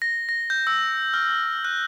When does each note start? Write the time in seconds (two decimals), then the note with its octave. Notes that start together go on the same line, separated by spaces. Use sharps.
0.02 A#6
0.29 A#6
0.50 G6
0.67 E6
1.14 F6
1.65 F#6